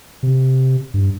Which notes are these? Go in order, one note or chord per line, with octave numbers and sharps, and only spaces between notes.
C3
G2